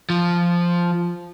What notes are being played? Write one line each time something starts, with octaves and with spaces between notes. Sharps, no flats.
F3